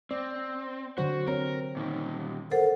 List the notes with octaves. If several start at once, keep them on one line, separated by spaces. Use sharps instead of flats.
C4 D5
D3 F#3 F#4 C5
C4 A#4 C#5
A#2 D#3
A4 A#4 C5 F#5